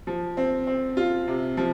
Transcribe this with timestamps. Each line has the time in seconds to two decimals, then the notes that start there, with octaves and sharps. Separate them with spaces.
0.07 F3
0.37 C4
0.67 C4
0.97 F4
1.28 C3
1.57 F3